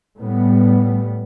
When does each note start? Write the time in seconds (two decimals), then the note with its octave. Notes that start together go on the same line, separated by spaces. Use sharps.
0.18 A2 G3 B3